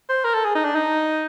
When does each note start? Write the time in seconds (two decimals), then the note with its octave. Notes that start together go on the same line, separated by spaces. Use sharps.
0.09 C5
0.24 A#4
0.34 A4
0.45 G#4
0.55 D#4
0.65 D4
0.75 D#4